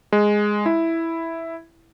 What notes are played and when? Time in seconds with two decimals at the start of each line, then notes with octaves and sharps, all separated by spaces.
0.12 G#3
0.66 E4